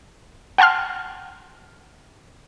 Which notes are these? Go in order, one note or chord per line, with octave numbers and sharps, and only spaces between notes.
F#5 G5 A5 C6 F6